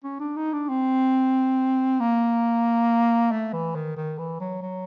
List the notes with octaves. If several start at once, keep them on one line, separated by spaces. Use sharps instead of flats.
C#4
D4
D#4
D4
C4
A#3
A3
E3
D#3
D#3
E3
F#3
F#3